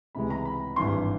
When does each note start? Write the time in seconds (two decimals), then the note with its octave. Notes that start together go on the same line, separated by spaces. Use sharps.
0.15 C#2 C3 E3 G#3 B5
0.30 A#5
0.45 B5
0.76 G#1 G2 E3 C6